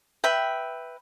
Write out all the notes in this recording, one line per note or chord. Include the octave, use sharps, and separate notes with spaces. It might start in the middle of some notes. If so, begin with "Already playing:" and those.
B4 E5 G5